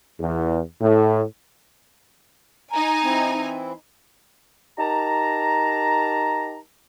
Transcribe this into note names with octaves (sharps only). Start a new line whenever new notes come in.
E2
A2
D#4 G#5 A#5
E3 C4 E4
D#4 G4 A#4 A5 A#5